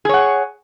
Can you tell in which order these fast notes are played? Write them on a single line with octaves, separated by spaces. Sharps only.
G#4 C#5 F#5